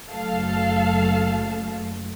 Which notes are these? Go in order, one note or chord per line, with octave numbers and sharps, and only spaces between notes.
F#1 F#3 A3 A4 F5 A5